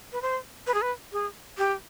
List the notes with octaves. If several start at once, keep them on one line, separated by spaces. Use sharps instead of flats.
B4
C5
B4
G#4
B4
G#4
G4